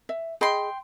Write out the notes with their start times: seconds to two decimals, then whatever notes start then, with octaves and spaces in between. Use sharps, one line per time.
0.09 E5
0.41 G#4 D#5 G5 B5 C6